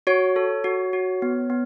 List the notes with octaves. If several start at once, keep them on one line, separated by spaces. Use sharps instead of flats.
F#4 C#5
A4
F#4
F#4
B3
B3